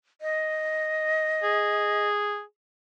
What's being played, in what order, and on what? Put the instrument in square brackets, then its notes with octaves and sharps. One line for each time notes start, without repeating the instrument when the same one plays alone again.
[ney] D#5
[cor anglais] G#4